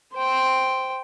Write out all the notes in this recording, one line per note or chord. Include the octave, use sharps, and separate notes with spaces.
C5 G5